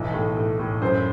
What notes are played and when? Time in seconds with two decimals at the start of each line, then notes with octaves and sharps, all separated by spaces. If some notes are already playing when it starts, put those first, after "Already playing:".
Already playing: B1 E3
0.14 A2
0.37 A2
0.59 A2
0.81 F#2 C5